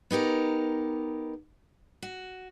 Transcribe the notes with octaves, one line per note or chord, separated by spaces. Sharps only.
B3 D#4 G4 A#4
F#4